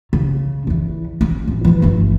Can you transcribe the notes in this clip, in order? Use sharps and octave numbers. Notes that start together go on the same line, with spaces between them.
C#3
E2 E3
C4 C#4
A1
E3 F3
G1 A3